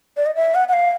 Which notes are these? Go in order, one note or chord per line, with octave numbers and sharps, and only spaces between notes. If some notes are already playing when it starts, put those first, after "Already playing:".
D5
D#5
E5
F#5
F#5
F5